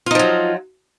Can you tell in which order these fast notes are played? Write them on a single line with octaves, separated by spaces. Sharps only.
F4 D#4 F3 F#3